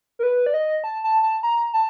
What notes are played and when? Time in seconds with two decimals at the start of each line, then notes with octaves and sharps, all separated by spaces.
0.19 A#4
0.23 B4
0.46 D5
0.54 D#5
0.84 A5
1.04 A5
1.23 A5
1.43 A#5
1.74 A5